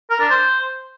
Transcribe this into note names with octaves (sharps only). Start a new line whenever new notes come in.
A#4
D4
C5